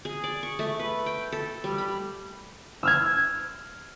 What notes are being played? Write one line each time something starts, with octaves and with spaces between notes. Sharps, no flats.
G#4
D5
C#6
A3
B4
G5
A4
G3
B5
E6 F6 G#6